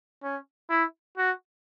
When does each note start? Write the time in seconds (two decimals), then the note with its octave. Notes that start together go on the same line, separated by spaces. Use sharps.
0.23 C#4
0.70 E4
1.17 F#4